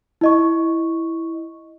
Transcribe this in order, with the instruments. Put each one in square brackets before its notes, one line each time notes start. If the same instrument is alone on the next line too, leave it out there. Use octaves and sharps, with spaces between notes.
[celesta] E4 D#5 C#6